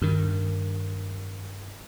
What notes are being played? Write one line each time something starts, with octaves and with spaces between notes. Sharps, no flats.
G2 D#3